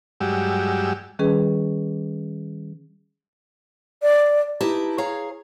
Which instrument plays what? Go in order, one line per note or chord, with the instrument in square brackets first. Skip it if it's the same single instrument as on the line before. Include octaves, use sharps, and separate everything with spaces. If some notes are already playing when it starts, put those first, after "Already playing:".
[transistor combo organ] G2 F#3 G#3 G4 E6
[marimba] D#3 G3 C#4 G#4 B4
[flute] D5
[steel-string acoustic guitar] D#4 E4 G4 B4 A5 A#5
G#4 C#5 F5 A#5